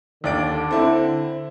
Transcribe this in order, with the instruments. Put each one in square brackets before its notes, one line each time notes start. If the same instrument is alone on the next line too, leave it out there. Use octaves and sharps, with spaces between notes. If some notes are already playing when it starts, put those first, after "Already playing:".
[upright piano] D#2 D5 D7 [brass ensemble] D3
[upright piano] C4 E4